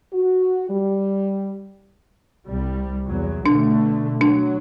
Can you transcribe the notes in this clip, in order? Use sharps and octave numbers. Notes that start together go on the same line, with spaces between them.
F#4
G3
C2 G3
E2 F#3
B2 D3 A3 D4
F#3 D4